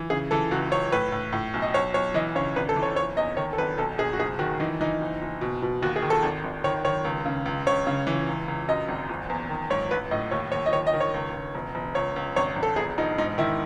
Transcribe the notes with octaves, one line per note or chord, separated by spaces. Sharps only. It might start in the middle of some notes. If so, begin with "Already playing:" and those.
Already playing: E3
C#3 G#4
E3 A4
C#2 F#4
C#2 C#5
A2 B4
A2
A2
B1
D#5
B1 C#5
B1 C#5
E3 D#5
C#3 C#5
G#1 B4
A4
E3
C#5
F#1 C#5
E2 D#5
D#3 C#5
A4
G#1 B4
B1 A4
B1 G#4
F#4
F#1 G#4
D#3 F#4
E3 D#4
E3 D#4
F#1
F#1
B2
B2
D#2 F#4
G#4
D#3
A4
G#1
G#1
D#3 C#5
D#3 C#5
C#2
C#3
C#2
C#2 C#5
C#3
E3
C#2
C#2
F#2 D#5
G#1
F#1
E2
D#3
G#2 C#5
A1 B4
A2 D#5
D#2 C#5
D#2 C#5
D#5
D#3 C#5
D#5
D#3
C#5
C#2
C#2
E1
E1
C#2 C#5
C#2
G#1 C#5
G#1
A4
E1 G#4
E1 D#4
G#2 D#4
D#3 E4